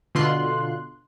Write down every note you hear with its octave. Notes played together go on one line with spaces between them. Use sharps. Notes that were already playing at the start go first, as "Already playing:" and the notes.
B2 D3 F4 C6 F#6